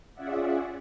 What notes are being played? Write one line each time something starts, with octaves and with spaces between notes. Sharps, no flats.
C#4 F4 G#4 D5 E5 F#5